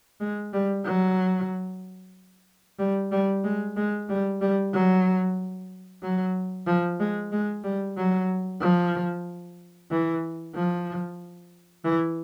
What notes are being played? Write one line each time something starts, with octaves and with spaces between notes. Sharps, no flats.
G#3
G3
F#3
G3
G3
G#3
G#3
G3
G3
F#3
F#3
F3
G#3
G#3
G3
F#3
F3
E3
F3
E3